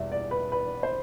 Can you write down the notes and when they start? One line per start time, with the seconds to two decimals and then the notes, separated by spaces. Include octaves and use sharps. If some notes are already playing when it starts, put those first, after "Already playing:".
Already playing: E2 B2 G3 E5
0.12 D5
0.31 B4
0.52 B4
0.83 C5